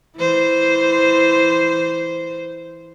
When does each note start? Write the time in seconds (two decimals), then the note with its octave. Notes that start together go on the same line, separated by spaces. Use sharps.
0.17 E3 C5